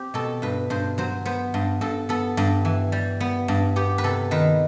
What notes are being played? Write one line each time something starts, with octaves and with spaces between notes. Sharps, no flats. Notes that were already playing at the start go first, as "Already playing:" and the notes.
Already playing: C4 G4
B2 A4
G2 B4
G2 C5
F#3 C5
B3 C5
G2
G2 A4
B3 A4
G2
E3
G3
B3
G2
B3 G4
B4
C3 A4
D#3 B4